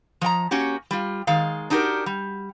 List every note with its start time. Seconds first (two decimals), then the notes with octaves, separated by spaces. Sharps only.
0.21 F3 D#5 G5 A#5
0.51 A#3 C#4 F#4 G4
0.91 G3 F4
1.27 D#3 G#3 F5
1.70 D4 D#4 F#4 G4 A4 A#4
2.06 G3